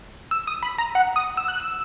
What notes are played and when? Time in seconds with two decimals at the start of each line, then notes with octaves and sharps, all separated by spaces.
0.31 E6
0.47 D#6
0.63 B5
0.78 A#5
0.95 F#5
1.16 D#6
1.37 E6
1.48 F#6
1.60 E6